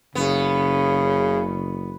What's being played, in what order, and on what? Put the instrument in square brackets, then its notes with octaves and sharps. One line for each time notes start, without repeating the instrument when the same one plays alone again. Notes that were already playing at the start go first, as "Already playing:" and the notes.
[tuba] F#1 [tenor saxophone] C#3 [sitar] B3